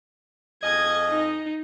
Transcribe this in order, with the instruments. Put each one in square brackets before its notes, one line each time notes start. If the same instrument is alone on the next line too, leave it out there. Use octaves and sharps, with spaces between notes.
[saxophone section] F2 G#4 D#5 [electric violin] G#6
[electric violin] D#4